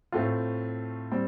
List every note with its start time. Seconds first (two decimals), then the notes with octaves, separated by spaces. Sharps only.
0.12 A2 A3 C4 F4
1.11 G3 C4